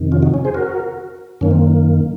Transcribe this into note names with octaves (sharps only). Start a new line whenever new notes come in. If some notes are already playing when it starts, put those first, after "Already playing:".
Already playing: F2 C3 D#3
C#4 F4
D#4 F#4
C#4
G#4 C5
F#4 A#4
F#2 D#3 A#3 C#4
C4